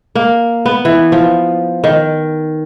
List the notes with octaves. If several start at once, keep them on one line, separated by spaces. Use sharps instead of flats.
A#3
B3
E3
F3
D#3